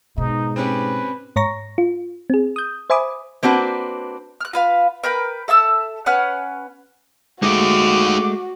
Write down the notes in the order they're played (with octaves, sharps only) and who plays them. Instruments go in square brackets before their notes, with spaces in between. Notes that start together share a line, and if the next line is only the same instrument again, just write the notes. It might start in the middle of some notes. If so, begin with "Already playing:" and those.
[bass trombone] G#2 [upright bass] B2 [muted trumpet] D#4
[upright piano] C4 C#4 G4 [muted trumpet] B4
[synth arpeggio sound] G#2 C#5 A#5 C#6 A#6
F4
C4 G#4
D#6 G6
C5 E5 G#5 B5 D6 D#6
[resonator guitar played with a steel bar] A#3 C4 D4 F#4 B4
[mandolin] F6 F#6
F4 B4 F5
A#4 B4 G5 B5
A4 E5 A5 E6
C#4 B4 F#5 F6
[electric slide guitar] G#3 A3 [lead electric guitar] D#4 G4 [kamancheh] F#4 [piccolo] D6